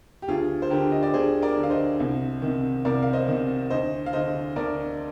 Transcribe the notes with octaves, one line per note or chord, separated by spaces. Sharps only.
G4
D2 F4 G#4
C5
D3 G4 A#4
D#5
D5
D2 G#4 C5
A#4 D5
D3
F5
C5 D#5
C2
C3 D#3
C2 A#4 D5
F5
C5 D#5
C3 D#3
D2 C5 D#5
F5
D3 C5 D#5
D2 A#4 D5